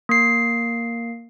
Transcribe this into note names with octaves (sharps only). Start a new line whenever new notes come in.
A#3 C7